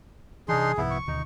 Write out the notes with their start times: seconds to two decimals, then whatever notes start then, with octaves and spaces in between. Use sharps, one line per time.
0.49 C3 E3 D4 D#4 G#4 C6
0.77 C2 G#2 F3 B3 E4
0.90 C#6
1.07 D2 B2 D#3 D#4